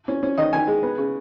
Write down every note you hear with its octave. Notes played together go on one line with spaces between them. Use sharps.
C#4
C#4
D#3 D#5
D#3 G#5
G#3
B3
C#3